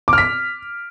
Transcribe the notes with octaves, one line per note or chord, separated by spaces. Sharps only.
D6
F6
B6